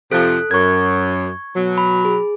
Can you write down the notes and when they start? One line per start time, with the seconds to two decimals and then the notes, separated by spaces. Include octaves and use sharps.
0.12 F2 C3 F3 A4 F#6
0.51 F#2 C#6 G#6
1.56 B2 F#3
1.78 B5
2.05 G#4